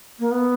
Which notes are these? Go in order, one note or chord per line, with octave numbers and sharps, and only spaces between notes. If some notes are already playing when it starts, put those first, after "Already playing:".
A#3
B3